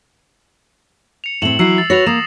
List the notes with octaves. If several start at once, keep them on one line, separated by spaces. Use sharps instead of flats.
C#7 F7
A2 C4 E7 F#7
F#3 E4 E6 C7
A6
F#4 B4 C#5 A#6 F7
A#3 D#6 E7